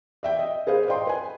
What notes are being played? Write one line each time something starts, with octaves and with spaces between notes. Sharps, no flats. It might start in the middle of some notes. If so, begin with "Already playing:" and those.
D5 E5 G5
D#5
G#4 B4 C5 F5
D5 D#5 G5 C6
B4 G#5